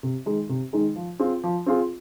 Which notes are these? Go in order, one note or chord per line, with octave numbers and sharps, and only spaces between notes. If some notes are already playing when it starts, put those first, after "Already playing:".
C3
D#3 G#3 D#4 G#4
C3
D#3 G#3 D#4 G#4
F3
C4 F4 G#4
F3
C4 F4 G#4